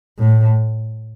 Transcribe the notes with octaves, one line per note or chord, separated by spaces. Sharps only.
A2